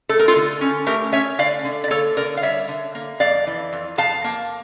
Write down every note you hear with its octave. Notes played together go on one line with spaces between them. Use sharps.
A3 A4
A#4
F4 A4
D3
C#4
A3 G4 A#4
C#4 C#5 E5
D3 D5 F5
D3
D5
A#3 A4 C#5
D3 A#4 D5
F5
G3 C#5 E5
D3
A#3
F2 D5 F5
E3
F2
F2 F5 A5
A#3